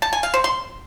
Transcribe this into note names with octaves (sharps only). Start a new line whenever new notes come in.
A5
G#5
F5
C5
C6